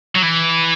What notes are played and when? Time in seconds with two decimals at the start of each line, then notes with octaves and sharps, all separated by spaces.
0.16 F#3
0.23 E3